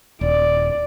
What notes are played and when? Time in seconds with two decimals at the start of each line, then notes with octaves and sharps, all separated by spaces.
0.21 D#1 D5